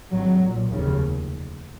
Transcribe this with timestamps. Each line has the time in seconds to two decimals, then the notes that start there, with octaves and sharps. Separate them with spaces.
0.10 G#1 G2 F#3
0.41 B1 A#2
0.71 F1 D#2 C#3